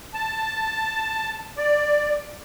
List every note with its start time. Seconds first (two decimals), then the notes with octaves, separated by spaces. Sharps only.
0.13 A5
1.57 D5